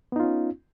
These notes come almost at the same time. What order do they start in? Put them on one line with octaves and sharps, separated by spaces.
B3 D#4 F4 C#4